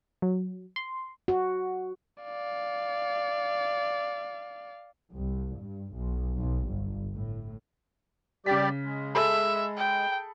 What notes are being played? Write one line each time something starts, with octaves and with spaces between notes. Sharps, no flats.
F#3
C6
F#4
D5 F5
C2
G2
B1
B1
G1
A2
C#3 G3 G4 D5 B6
G#3
G#4 A4 E5 B5
G5